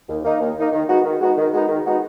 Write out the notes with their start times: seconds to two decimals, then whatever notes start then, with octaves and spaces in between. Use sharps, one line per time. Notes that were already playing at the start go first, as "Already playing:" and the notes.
0.08 D#2
0.23 D#3 A#3 D#4
0.40 D#2
0.57 D#3 A#3 D#4
0.73 D#3
0.88 G#3 B3 D#4 F#4
1.05 D#3
1.20 G#3 B3 D#4 F#4
1.37 D#3
1.53 G#3 B3 D#4 F#4
1.68 D#3
1.85 G#3 B3 D#4 F#4